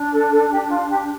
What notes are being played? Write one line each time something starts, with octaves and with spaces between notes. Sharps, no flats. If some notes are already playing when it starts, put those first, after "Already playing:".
Already playing: D4
A4
A4
G4
F4
G4